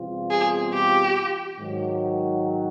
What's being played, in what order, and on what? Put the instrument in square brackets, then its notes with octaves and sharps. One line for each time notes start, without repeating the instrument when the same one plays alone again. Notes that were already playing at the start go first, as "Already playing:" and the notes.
Already playing: [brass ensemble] E2 B2 G3 C4 F4
[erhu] G#4
G4
[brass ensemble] G#2 D#3 F#3